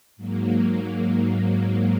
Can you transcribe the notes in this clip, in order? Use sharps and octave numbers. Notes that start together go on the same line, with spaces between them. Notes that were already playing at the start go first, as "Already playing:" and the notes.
G#2 F#3 A#3